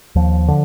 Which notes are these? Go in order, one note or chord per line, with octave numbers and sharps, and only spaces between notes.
D#2 F3
D3